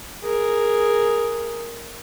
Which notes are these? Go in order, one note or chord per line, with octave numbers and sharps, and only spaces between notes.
G#4 A#4